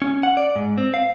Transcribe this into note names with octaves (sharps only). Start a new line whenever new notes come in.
C#4
F#5
D5
G#2
C4
F5